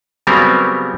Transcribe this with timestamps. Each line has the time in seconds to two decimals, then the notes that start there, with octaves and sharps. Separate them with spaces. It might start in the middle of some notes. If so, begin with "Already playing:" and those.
0.27 C#3 F#3 G3 B3 C4 A#4